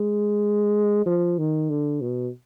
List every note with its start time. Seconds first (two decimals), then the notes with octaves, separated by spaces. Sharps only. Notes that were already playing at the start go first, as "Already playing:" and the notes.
Already playing: G#3
1.06 F3
1.38 D#3
1.70 D3
2.01 B2